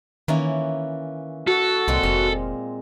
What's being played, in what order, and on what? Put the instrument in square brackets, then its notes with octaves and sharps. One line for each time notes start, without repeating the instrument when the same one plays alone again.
[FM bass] D#3 [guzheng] E3 A#3 C#4
[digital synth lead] F#4 [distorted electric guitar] A4
[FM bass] C2 [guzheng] A#2 G#3 C4
[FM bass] F1 [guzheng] F5